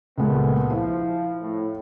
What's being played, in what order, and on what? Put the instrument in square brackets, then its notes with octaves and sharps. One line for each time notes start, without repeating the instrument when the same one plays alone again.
[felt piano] C#2 A#2 G#3 [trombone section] A3 B3
[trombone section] F3 [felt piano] E4
[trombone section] A2